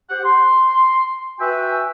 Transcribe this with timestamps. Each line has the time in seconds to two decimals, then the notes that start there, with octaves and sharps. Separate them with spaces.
0.10 G4 C5 F#5
0.24 C6
1.40 F#4 B4 E5 G5 G#5